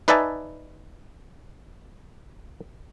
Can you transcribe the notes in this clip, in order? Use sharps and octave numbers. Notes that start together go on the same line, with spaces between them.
D#4 B4 D5 E5 G#5 A5